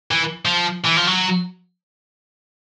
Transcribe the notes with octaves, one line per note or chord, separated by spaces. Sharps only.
E3
F3
E3
F3
F#3